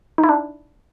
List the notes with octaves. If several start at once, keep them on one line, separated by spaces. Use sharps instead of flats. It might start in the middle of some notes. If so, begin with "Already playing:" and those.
D#4
E4
D4